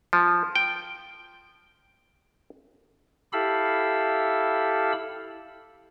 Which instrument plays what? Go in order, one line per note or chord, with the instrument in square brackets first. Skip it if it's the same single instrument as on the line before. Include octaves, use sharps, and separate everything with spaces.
[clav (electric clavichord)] F3
G5
[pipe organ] E4 G4 A4 F5 B5 E6